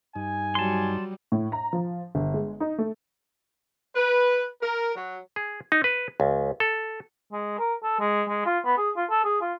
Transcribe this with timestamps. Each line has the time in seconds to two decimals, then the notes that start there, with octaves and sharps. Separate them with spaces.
0.15 G2 D#4 G#5
0.55 F#3 G3 A5 C6
1.32 A2
1.52 A#5
1.73 F3
2.15 G1
2.34 G#3
2.60 D#4
2.78 A3
3.96 B4
4.62 A#4
4.96 F#3
5.36 G#4
5.72 D#4
5.84 B4
6.20 C#2
6.60 A4
7.33 G#3
7.59 A#4
7.83 A4
8.00 G#3
8.29 G#3
8.46 F4
8.65 B3
8.78 G#4
8.96 F4
9.10 A4
9.25 G#4
9.41 F4